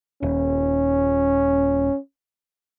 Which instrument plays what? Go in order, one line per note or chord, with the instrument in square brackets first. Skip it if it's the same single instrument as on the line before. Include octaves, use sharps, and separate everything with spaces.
[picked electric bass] D#1 [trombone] C#4